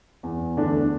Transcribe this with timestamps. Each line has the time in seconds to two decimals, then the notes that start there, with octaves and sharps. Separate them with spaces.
0.23 E2
0.57 D2 D3 D4